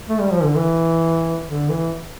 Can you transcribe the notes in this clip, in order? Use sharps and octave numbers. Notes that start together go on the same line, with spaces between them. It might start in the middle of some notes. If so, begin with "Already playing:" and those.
A3
G3
F3
D3
E3
D3
E3